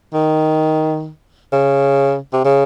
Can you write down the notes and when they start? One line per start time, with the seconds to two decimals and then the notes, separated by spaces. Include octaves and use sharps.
0.14 D#3
1.52 C#3
2.33 C3
2.44 C#3